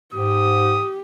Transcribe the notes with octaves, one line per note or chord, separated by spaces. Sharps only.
G#2 G4 D#6